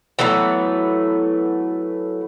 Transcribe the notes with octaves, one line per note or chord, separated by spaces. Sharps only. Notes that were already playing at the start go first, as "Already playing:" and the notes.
E3 F#3 A3 B3